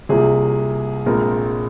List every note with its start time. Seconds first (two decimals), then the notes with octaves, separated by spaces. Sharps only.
0.09 C2 C3 F3 A#3 G#4
1.06 A#1 A#2 G#3 C4 A#4